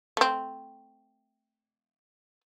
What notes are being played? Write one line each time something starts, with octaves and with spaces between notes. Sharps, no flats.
A3 C4